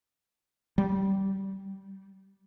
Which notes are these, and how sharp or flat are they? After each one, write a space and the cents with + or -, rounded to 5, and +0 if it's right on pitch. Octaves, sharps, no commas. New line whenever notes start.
G3 -20